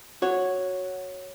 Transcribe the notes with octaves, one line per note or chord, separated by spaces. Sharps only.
F#4 C#5